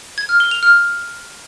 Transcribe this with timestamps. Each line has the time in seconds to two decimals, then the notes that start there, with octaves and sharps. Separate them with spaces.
0.18 G#6
0.29 F6
0.40 G7
0.51 F7
0.63 F6